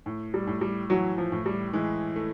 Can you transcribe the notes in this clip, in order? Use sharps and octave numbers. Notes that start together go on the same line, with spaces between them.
A2
G3
A2
G3
E3 F#3
F3
A2
G3
E3 G#3
A3